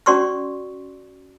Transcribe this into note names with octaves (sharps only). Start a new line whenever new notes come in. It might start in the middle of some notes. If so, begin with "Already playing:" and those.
C#4 F#4 D5 C6 C#6 E6